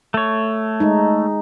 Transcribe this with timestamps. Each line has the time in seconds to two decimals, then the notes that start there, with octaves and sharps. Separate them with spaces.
0.14 A3 C#5
0.80 G#3 D#4